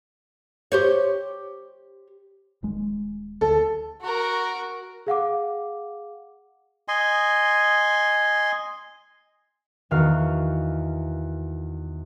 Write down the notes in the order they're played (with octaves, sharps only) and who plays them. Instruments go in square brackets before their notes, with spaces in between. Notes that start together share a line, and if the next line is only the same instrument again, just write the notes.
[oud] G4 C5 C#5
[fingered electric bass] D#1 G#3
[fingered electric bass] D2 [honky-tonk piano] A4
[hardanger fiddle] F#4 A#4
[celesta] G#4 F5 F#5 D6
[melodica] D#5 G#5 C6
[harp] E2 D#3 F#4 F5 F6